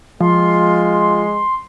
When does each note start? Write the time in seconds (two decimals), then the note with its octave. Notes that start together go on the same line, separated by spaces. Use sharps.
0.21 F3 G#3 F4 C6